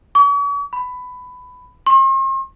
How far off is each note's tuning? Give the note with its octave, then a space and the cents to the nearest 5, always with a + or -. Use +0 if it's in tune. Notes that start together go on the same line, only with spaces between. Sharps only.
C#6 +45
B5 +15
C6 +45